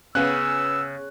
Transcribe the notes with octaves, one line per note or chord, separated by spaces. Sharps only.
C#3 B3 C#4 E6 F#6